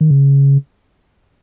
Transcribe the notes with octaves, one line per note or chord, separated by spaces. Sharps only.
D#3
C#3